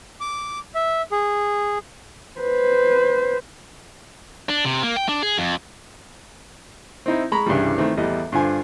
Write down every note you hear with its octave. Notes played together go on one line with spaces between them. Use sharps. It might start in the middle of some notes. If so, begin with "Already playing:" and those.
D6
E5
G#4
B4 C5
D4
C3
A#3
G5
D4
G#4
F2
C4 D#4 E4
G#3 A#5 B5 C#6
C2 G2 C#3 E3 G3
D#3 E3 A3 C4
A1 E2 G3 D#5
G2 D3 F4 C5 G#5